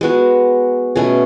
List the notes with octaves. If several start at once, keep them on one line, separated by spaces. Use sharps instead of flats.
G#3 B3 F#4
B2 A3 C#4 G#4